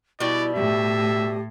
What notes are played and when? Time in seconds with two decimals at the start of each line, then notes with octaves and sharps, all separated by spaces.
0.20 B2 G3 E4 D5
0.55 A2 G4 E5